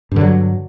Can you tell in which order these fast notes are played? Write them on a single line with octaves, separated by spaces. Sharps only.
G2 D3 F#3